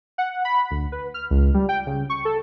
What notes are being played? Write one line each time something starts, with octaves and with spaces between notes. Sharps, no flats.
F#5
B5
D2
B4
F6
C#2
G3
G5
C#3
C#6
A4